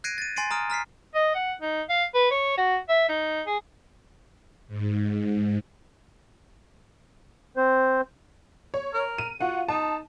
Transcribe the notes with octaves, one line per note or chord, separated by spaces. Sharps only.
F#6 G#6 A#6 C7 D7 D#7
A6 D#7
G#5 C6 A6 C7 D7 D#7
A#5 D#6 F6 D7
A#5 F6 B6 C7
D#5
F#5
D#4
F5
B4
C#5
F#4
E5
D#4
G#4
G#2
C4 C5
C#5
A#4
D#7
F4 F#4 F#5
D#4 A5